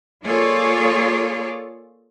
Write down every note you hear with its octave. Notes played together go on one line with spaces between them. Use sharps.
A#3 F4 G#4 A4 C#5 D5